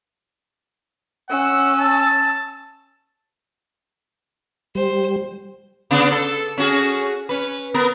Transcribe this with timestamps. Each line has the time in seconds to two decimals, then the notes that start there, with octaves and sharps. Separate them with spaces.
1.30 C#4 F#5 E6
1.79 A5
4.75 G3 C5
5.91 C#3 B3 D4
6.12 A4
6.58 C#4 F#4 G#4
7.29 C#4 B4
7.74 B3 A#4